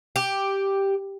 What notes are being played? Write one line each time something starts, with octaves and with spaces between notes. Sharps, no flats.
G4